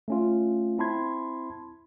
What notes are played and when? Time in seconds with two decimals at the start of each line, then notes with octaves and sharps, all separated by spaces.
0.08 A3 C#4 F4
0.78 C4 E4 A5 B5 C6 G#6